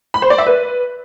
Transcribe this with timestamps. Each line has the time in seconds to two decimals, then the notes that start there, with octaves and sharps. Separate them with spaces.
0.14 B5
0.22 C5
0.30 D5
0.38 E5
0.47 B4